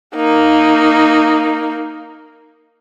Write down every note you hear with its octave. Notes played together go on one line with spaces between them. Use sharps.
A#3 D#4